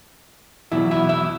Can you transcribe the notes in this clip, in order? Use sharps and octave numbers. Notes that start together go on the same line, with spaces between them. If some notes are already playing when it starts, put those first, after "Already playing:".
E2 B2 F#3 E4 E5
E4 E5
E4 E5